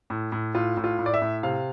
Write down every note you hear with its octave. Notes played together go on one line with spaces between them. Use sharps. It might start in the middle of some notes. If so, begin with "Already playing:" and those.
A2
A2
A2 F4
A2
F4
A2
D5
E5
A2
C3 F5